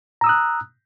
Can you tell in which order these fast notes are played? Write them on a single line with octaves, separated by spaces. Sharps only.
A#5 E6 D#6 F#6